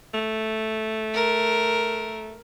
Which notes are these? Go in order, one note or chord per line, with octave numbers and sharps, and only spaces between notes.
A3
A#4